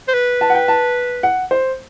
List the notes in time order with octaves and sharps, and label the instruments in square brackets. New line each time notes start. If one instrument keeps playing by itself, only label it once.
[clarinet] C5
B4
[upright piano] A5
F#5
G5
A5
F#5
C5